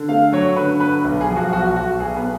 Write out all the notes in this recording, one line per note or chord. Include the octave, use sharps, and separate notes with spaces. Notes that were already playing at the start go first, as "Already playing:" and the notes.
Already playing: D3
A3 F5
F#3 C#5
D3 B4
F#3 B4
B1
G#4
F3
F#4
B1 F#4
B1 F#4
B1 G#4
B3